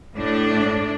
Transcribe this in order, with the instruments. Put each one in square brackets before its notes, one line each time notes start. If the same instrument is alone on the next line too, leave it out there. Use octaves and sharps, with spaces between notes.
[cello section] A2 D4